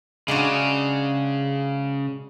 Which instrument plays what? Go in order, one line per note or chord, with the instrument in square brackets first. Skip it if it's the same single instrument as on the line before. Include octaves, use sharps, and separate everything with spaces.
[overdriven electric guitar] C#3 [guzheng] G#3 D4 F#4